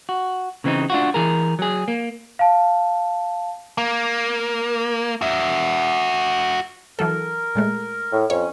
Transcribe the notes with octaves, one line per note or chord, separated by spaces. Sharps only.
F#4
C#3 E3 C4 D4 D#4
D4 F4 F#4
E3 G#4 A#4
F#3 G#4
A#3
F5 A5
A#3
F#4 E5
E3 F#3 A4 A#4
A#2 G#3 A3
A2
F2 C#4 C#5